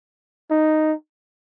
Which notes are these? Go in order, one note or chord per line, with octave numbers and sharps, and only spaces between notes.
D#4